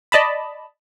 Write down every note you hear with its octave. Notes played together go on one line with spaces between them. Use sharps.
D5 D#5 A5 B5